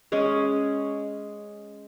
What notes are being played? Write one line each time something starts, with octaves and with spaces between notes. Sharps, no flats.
G#3 C#4 G#4 C#5